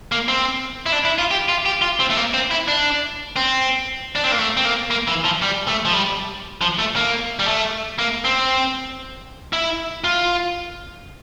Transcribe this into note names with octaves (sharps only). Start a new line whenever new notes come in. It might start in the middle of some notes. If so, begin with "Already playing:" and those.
A#3
C4
E4
D4
E4
F4
G4
F4
G4
F4
C4
A3
A#3
C4
E4
D4
C4
D4
C4
A#3
A3
C4
A#3
A#3
E3
F3
G3
A3
F3
G3
F3
A3
A#3
G3
A3
A#3
C4
E4
F4